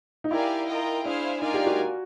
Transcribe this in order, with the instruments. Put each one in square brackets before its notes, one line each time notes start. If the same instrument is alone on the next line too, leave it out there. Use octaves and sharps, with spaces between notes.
[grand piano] D#4
[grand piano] E4 [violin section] G4 A#4 D5 F5 G#5
[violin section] F4 A#4 D#5 G5
[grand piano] D4 [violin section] E4 G#4 C5 F5 G#5
[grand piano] D#4 [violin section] F4 A#4 D5 F5 G#5
[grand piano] G4
F#4